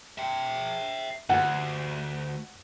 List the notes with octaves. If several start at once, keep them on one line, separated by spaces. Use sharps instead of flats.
E5 G5
D2 F#5